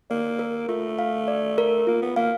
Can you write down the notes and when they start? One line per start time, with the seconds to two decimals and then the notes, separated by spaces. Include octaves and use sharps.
0.10 A#3 D5
0.39 A#4
0.68 A3 F4
0.99 F5
1.28 D5
1.58 A#4
1.87 A#3 F4
2.02 B3
2.16 A#3 F5